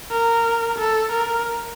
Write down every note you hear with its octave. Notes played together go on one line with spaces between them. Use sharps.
A#4
A4
A#4